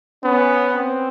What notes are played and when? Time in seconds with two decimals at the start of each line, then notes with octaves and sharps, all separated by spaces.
0.24 B3 C#4
0.74 C4